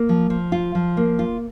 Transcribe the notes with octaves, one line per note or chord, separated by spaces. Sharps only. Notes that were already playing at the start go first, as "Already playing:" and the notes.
Already playing: A#3
F3
F3
F4
F3
A#3
F4